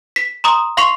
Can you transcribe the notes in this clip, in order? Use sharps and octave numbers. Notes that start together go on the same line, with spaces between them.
B6
A#5 C6 D#6
F5 C6 C#6 C7 F7